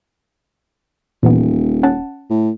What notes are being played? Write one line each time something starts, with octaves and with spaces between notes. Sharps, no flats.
D#1 A#2 E3 B3
C#4 F#5 A5
A2